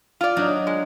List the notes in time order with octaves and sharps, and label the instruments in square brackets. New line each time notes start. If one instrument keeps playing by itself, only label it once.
[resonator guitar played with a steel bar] F4 D5
[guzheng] F#3 D4 D#4
[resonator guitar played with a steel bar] G#3